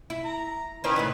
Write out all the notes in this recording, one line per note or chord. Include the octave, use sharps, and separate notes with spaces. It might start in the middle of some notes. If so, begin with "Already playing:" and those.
E4
A#5
D#3 C#4 E4 B4 C5
A2 C#3 E3